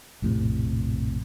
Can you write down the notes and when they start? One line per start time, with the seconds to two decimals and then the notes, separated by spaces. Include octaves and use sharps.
0.22 A#1 F2 A2 C3